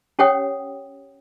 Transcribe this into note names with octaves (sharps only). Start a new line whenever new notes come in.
C#4 G4 C#5 F#5 G5 D#6